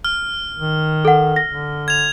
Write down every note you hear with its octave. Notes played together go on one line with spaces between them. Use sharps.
F6
D#3
A4 F#5
A#6
D3
G#6 F7